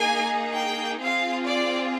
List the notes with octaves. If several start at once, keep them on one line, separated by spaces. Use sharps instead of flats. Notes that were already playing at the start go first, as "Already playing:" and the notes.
Already playing: A#3 D#4 G#4 G#5
G5
C4 F4 G#4 F5
D5